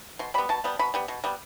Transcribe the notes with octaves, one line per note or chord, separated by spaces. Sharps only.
B2 C6
G3 B3 B5
B2 A5
G3 B3
B2 B5
G3 B3
B2
G3 B3